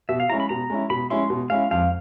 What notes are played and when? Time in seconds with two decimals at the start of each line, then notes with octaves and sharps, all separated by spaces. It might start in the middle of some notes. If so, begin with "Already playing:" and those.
0.09 B2 E5
0.20 F5
0.29 G#3 C#4 E4 A#5
0.40 B5
0.49 B2 A#5
0.70 G#3 C#4 E4
0.90 B2 B5
1.10 G#3 C#4 E4 C6
1.30 B2
1.50 G#3 C#4 E4 F5
1.71 F2 F5